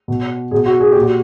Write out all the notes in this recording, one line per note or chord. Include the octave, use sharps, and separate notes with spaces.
B2
B2 G#4
F#4
G#4
A#2 G4
F#4